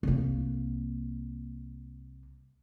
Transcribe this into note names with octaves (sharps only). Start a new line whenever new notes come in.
C2 A#3